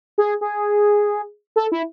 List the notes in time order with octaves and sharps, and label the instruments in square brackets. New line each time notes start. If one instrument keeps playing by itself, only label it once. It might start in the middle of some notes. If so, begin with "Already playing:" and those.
[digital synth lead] G#4
G#4
A4
E4